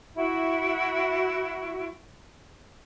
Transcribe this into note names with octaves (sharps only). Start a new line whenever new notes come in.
E4 F#4